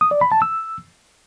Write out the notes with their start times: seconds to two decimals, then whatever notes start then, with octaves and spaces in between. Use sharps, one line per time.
0.01 D#6
0.11 D5
0.21 B5
0.32 A5
0.42 E6